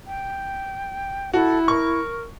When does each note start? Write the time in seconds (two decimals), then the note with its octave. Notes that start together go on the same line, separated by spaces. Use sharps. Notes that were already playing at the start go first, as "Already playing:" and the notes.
0.07 G5
1.34 E4 F#4 A4
1.68 A#4 C#6